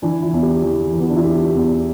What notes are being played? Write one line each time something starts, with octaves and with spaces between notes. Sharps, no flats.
E3 D4
E4
E2
G4
E3
E3
B3
D4
E4
E2 G4
E2